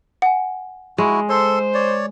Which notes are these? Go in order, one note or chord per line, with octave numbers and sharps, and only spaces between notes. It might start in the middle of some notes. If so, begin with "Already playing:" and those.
F#5 G#5
G#3 E4 F#4
A4 C5 C6
C#5 D5